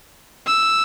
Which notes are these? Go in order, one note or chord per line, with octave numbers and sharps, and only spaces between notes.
E6